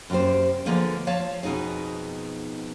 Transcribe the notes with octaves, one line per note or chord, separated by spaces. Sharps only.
F#2 C3 A#3 G4 C5
D3 F3 G#3 A#3 B3
F3 C#5 F5 A5
F2 B2 F#3 D#4 G#4